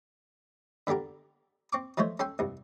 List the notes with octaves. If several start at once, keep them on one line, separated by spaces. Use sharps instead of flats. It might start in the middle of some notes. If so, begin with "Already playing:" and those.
D3 B3 D4 G4 A#4
C4 C#6 D6
F3 G#3 A3 C5 C#5
C#4 A4 G5 C6
C2 G2